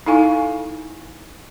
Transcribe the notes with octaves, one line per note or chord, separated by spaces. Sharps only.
D#4 E4 A4 F5 G#5 C#6